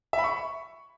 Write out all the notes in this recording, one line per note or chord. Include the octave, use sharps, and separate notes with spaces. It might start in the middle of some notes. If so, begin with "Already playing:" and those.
E5
B5
C#6